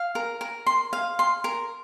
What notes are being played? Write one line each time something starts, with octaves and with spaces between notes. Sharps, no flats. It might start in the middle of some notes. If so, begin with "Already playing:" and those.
Already playing: F5
A#4
A#4
C6
F5
C6
A#4